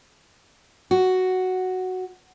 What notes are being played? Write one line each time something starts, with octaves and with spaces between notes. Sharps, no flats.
F#4